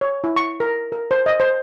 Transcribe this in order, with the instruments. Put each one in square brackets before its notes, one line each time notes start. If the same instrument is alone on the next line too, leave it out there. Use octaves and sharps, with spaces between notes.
[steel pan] C#5
E4
C#6
A#4
A#4
C5
D#5
C5